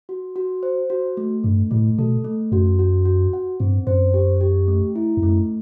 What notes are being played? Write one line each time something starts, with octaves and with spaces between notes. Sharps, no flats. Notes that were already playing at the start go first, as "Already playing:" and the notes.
F#4
F#4
C5
F#4
A3
G2 A3
A2 A3
B2 A4
A3
F#2 F#4
F#4
F#4
F#5
G2 C4
F#2 C5
G4
G4
A3
E4
E2
F#2 A3